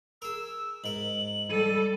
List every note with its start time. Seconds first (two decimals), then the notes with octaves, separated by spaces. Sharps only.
0.22 G#4 A#4 E6
0.84 G#2 A#4 F#7
1.50 G3 A4 D#7